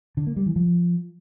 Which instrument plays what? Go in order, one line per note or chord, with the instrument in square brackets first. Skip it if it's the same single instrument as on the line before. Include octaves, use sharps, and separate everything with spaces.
[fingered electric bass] D3
A#3
G3
E3
F3